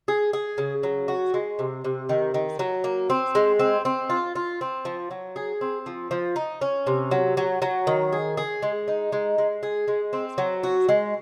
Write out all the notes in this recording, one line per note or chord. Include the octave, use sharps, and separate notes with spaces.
G#4
G#4
C#3
F#3
F#4
G#3
C3
C3
D#3
D#3
F#3
A#3
C4
G#3
C4
C4
F4
F4
C4
F3
F#3
G#4
C4
F3
F3
D#4
C#4
C3
F#3
F#3
F#3
D#3
G#4
G#4
G#3
D#4
G#3
G#3
G#4
G#3
C4
F#3
F#4
G#3